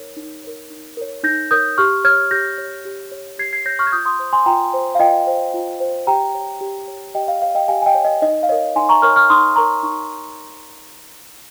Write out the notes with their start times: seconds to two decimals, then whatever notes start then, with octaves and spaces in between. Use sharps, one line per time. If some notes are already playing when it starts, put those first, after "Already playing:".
Already playing: D#4 A#4 C#5
0.16 D#4
0.44 A#4 C#5
0.70 D#4
0.97 A#4 C#5
1.24 D#4 G6 A#6
1.51 A#4 C#5 D#6 G6
1.78 G4 C#6 F6
2.04 C#5 F6 G#6
2.31 G4 G6 A#6
2.58 C#5
2.85 G4
3.12 C#5
3.38 G4 G#6 C7
3.53 G#6 C7
3.65 C#5 G6 A#6
3.79 C#6 F6
3.87 G#6
3.92 F4 D#6 G6
4.05 C6 D#6
4.19 C5
4.33 G#5 C6
4.46 F4 G5 A#5
4.73 C5
4.95 F5
4.99 F4 D#5 G5
5.27 C5
5.54 F4
5.80 C5
6.07 G4 G5 A#5
6.35 C#5
6.61 G4
6.88 C#5
7.15 G4 D#5 G5
7.28 F5
7.42 C#5 F5
7.55 D#5 G5
7.68 G4 F5 G#5
7.82 G#5
7.86 D#5 G5
7.95 C#5
8.05 D#5
8.22 D#4 D#5
8.43 F5
8.49 A#4 C#5 D#5
8.76 D#4 G#5 C6
8.89 A#5 C#6
9.02 A#4 C#5 C#6 F6
9.16 C#6 F6
9.30 D#4 C6 D#6
9.56 A#4 C#5 A#5 C#6
9.83 D#4 C#6